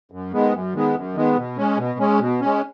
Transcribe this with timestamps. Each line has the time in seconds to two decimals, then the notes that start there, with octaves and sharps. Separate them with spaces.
0.12 F#2
0.33 D#3 G#3 B3
0.53 F#2
0.75 D#3 G#3 B3
0.96 F#2
1.15 D#3 G#3 B3
1.37 B2
1.57 G#3 C#4
1.78 B2
1.99 G#3 C#4
2.20 B2
2.41 G#3 C#4